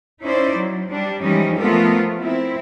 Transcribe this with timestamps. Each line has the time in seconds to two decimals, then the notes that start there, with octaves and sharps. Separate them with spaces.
0.23 C#4 D#4 E4 C5 D5
0.57 F#3
0.89 G3 D4
1.22 E3 F3 G3 G#3 C#4 D#4
1.58 F3 A3 B3 F4 A4 A#4
2.22 C4 E4